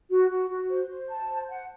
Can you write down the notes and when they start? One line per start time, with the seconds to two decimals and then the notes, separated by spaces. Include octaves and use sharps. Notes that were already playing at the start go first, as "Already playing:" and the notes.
0.09 F#4
0.29 F#4
0.49 F#4
0.69 C5
0.89 C5
1.09 A5
1.28 C5
1.49 F#5